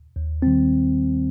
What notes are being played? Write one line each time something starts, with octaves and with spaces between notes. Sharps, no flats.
D#2
D#3 G3 C4